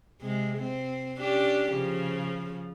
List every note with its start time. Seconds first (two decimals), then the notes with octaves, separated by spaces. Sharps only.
0.21 C3 G#3
0.58 C4
1.20 C#4 D4 G4
1.73 C#3 F3